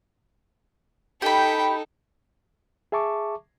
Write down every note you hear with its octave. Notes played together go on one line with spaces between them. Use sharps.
D#4 G4 A4 G5 B5
G#4 E5 A5 C#6 D6